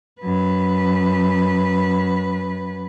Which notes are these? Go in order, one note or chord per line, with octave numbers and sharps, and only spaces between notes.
F#2 B4